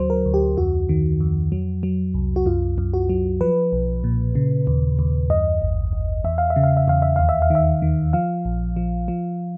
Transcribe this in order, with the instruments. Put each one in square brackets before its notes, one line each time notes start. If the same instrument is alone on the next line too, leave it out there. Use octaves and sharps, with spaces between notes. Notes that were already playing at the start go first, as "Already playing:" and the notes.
Already playing: [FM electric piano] D2 F#3 C5
A#4
D2
G4
F2 F#4
D#3
F2
F#3
F#3
C2
F#4
F#2 F4
F#2
F#4
F#3
F3 B4
B1
A#2
C#3
D#2
D#2
F#2 D#5
G#1
G#1
E2 E5
F5
E5
C#3
F5
E5
E2 F5
E5
D#2 F5
E5
F5
D#3 E5
D#3
F3 F5
A#1
F3
F3